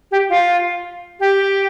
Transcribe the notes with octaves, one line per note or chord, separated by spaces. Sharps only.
G4
F4
G4